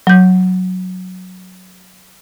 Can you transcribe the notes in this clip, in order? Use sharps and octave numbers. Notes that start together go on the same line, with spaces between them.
F#3 G6